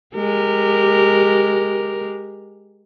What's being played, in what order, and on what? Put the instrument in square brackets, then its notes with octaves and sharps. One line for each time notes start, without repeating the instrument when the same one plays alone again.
[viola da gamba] G#3 G4 A#4